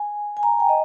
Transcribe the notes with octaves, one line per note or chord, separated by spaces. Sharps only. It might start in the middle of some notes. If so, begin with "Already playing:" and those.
Already playing: G#5
G#5
A#5
G5
D#5